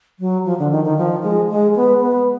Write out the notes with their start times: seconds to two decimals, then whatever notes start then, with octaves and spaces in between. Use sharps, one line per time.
0.20 F#3
0.45 F3
0.59 D3
0.71 D#3
0.85 D#3
0.98 F3
1.23 G#3
1.49 G#3
1.76 B3
2.01 B3